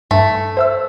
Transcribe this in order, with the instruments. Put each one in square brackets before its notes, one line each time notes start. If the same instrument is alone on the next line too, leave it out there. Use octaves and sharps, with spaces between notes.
[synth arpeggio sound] G2 [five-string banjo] A3
[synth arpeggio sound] C5 E5 E6